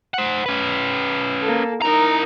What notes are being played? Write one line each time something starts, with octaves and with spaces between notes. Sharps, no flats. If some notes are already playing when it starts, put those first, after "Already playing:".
C5 F#5
C#4 B4
A#3 A4
D#4 E4 A#4 A#5